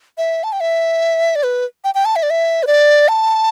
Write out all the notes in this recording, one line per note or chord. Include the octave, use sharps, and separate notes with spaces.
E5
A5
G5
E5
D5
B4
G5
G5
A5
E5
D5
E5
B4
D5
A5